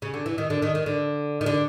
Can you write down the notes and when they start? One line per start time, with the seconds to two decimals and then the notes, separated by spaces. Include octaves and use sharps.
0.02 C#3
0.14 D3
0.26 E3
0.38 D#3
0.50 D3
0.62 D#3
0.75 D#3
0.86 D3
1.41 D#3
1.46 D3